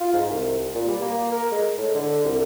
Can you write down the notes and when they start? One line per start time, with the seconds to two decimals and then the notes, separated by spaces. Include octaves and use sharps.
0.01 F4
0.14 G#2
0.30 C2
0.75 A#2
0.88 G3
1.02 A#3
1.32 A#4
1.52 G#3
1.78 A2
1.95 D3
2.25 C2